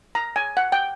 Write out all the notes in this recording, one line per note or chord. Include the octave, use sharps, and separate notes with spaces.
A#5
G#5
F#5
G5